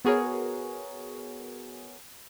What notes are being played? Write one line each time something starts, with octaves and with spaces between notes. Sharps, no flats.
B3 F#4 G#4 A#4 C#5